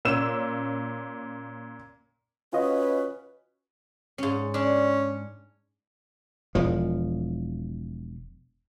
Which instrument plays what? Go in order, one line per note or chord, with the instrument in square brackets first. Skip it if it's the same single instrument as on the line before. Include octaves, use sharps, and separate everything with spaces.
[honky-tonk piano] A#2 C#4 E6 E7
[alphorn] C#4 [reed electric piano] F4 F#4 D#5 [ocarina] B4
[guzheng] G#2 C#4
[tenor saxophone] C#4 [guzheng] D4
[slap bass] E1 F3